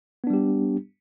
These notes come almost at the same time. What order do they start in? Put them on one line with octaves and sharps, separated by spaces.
B3 D4 G3 G4